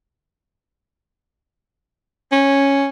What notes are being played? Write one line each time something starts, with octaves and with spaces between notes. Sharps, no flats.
C#4